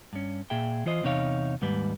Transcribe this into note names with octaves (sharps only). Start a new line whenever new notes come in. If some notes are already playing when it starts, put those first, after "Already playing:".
G2 C#4
A#2 G#4 E5 G5
E3 F4 C5 D#5
E2 C3 D#4 C#5 F5
D#2 G#2 G3 B4